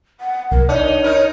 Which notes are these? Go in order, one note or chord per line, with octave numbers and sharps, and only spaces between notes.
F#5
C2 A#4
D4 D#4 C#5
D#4 A#4